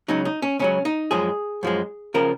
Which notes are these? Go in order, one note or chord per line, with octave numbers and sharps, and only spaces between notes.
C#2 C#3 F#3 D#4
D#4
C#4
C#2 C#3 F#3 C#4
D#4
F#2 F3 G#3 G#4
F#2 F3 G#3
C#3 F3 A#4